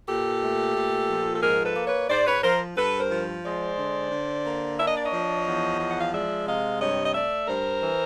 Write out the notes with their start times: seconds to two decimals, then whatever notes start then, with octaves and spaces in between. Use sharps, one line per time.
0.08 A#2 G4 A4
0.43 A3
0.76 A#2
1.09 F3
1.35 A4
1.43 G#2 G#4 A#4
1.65 A4 B4
1.76 A#3
1.87 B4 C#5
2.10 G#2 C5 D5
2.27 B4 C#5
2.43 F3 A#4 C5
2.77 G2 A4 B4
3.00 A#4 C5
3.10 F3
3.45 G#3 C5 D5
3.79 D3
4.12 D3
4.46 A#3
4.79 D4 E5
4.88 D#5
4.97 D5
5.06 C#5 D#5
5.13 F3
5.46 E2
5.79 F3
5.89 F#5
6.01 F5
6.13 G#3 D5 E5
6.47 C3 D#5 F5
6.80 G2 C#5 D#5
7.05 D#5
7.14 A3 D5 E5
7.48 G2 A#4 C5
7.81 E3